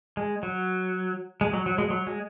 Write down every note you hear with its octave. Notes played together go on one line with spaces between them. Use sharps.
G#3
F#3
G#3
F#3
F#3
G#3
F#3
G#3